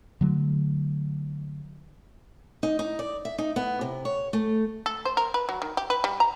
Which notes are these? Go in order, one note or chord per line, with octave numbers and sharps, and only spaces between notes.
D3 F#3 A3
D#4
D#4
D5
E5
D#4
B3
C3
C#5
A3
A4
C5
A#4
B4
F#3
D#3
G4
B4
G3
A#5